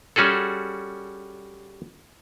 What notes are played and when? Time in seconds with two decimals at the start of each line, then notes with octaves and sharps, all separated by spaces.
0.16 G3 C#4 F#4 G#4 A4